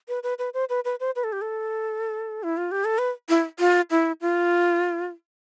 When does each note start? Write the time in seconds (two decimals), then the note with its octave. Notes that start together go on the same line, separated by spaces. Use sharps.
0.08 B4
0.23 B4
0.39 B4
0.54 C5
0.69 B4
0.85 B4
1.00 C5
1.16 B4
1.24 A4
1.32 G4
1.42 A4
2.43 E4
2.57 F4
2.71 G4
2.85 A4
2.98 B4
3.29 E4
3.59 F4
3.91 E4
4.21 F4